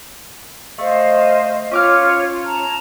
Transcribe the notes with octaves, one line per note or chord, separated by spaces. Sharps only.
A3 C5 D#5 F5
C#4 F4 C#5 D6 F6
A5 A#5